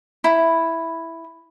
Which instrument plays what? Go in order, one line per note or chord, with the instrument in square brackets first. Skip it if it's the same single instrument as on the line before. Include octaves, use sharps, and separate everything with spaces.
[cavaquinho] E4